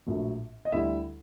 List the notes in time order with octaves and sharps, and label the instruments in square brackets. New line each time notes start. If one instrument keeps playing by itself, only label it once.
[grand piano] A#1 A2 F#3
D#5
D2 D3 G3 E4 E5